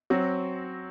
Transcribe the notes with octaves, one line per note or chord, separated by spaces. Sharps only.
F#3 C4 F#4